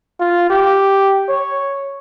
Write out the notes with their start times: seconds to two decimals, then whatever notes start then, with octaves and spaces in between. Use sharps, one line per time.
0.20 F4
0.50 G4
1.29 C#5